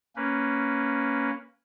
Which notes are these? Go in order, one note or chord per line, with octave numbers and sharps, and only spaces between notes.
A#3 C#4 B4